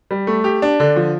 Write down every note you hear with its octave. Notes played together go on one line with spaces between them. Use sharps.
G3
A3
G4
D4
D3
F3